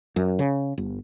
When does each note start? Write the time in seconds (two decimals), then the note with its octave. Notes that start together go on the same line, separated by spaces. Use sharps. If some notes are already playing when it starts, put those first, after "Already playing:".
0.16 F#2
0.39 C#3
0.78 G1